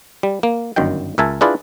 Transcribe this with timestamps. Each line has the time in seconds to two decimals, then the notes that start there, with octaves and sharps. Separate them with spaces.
0.23 G3
0.43 A#3
0.76 G1 F#2 D#3 G5
1.18 C#2 A#4 E5 G#5 A5
1.41 D4 E4 F4 G#4 B4 D5